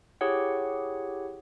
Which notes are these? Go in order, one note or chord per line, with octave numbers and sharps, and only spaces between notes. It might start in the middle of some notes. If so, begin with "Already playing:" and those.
E4 G4 G#4 C#5 F#5